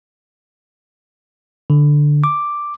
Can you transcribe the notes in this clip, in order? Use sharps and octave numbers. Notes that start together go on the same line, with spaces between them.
D3
D6